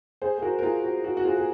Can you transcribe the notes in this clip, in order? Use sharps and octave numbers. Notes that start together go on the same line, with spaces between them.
G#4 C5
G#4
F#4 A#4
A#4
F4 G#4
F#4
F#4
F#4
F4 G#4
G#4